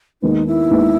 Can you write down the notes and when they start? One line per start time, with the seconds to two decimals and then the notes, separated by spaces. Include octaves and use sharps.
0.22 D#2 D#3 G#3 B3 D#4
0.47 E4
0.71 D#2 D#3 G#3 B3